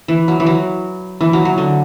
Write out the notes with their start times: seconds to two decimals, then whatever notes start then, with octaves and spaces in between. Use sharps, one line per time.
0.08 E3
0.28 F#3
0.40 E3
0.46 F#3
1.21 E3
1.33 F#3
1.45 F#3
1.58 D3